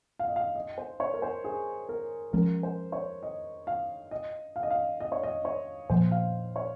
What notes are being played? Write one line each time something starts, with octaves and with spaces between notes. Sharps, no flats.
F5
D#5
F5
D#5
C5
C#5
A#4
C5
G#4
A#4
F3 G#3 C#4 A#4
C5
C#5
D#5
F5
D#5
F5
D#5
F5
D#5
C#5
D#5
C#5
A#2 F3 A#3 C5
F5
C#5